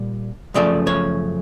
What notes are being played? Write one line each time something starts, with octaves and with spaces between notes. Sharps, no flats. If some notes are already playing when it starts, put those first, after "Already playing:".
Already playing: A#2 G3
F#2 C#3 F3 A3 D5
C#5